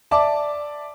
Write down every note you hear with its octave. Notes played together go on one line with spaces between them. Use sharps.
D5 E5 A5 D6